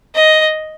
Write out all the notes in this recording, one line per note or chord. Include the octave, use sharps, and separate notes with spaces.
D#5